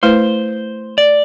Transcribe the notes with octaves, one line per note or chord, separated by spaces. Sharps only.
A3 E4 B4 C5
D5